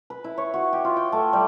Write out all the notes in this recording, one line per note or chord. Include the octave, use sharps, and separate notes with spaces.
B4
E4
C#5
F#4
G4
F4
G5
A3
G3